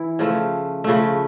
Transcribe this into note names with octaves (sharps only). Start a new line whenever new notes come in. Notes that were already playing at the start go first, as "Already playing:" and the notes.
Already playing: E3 E4
C#3 F3 A3
C#3 F3 A3